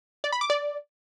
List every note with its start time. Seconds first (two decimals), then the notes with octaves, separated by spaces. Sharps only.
0.24 D5
0.32 B5
0.41 D6
0.50 D5